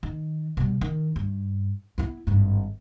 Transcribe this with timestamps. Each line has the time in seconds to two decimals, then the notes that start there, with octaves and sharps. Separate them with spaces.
0.03 D#3
0.57 B2 G3
0.81 D#3
1.16 G2
1.98 B3 E4
2.27 G#1 G2